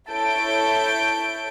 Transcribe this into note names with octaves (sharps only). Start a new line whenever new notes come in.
E4 A4 C#5 G6 D7